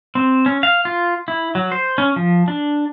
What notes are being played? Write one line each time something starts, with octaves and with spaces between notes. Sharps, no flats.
C4
C#4
F5
F4
E4
F#3
C5
C#4
F3
D4